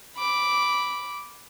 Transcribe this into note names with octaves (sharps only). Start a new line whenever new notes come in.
B5 D6